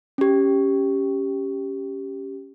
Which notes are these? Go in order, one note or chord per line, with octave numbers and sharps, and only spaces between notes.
C#4 G4